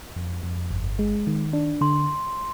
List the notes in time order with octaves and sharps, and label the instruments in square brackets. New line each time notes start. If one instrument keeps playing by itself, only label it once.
[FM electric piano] F2
F2
G1
G#3
D#3
D4
[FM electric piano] D3 [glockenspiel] C6